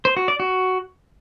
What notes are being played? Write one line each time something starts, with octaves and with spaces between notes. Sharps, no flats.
C5
F#4
D5
F#4